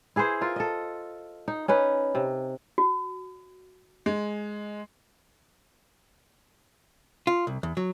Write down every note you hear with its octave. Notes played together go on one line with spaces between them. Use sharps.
E4 G#4 B4 C5
F4 A#4 E5
A4 D#5
D#4
C#4 D#4 B4
C3
F#4
G#3
F4
C2
E2
F#3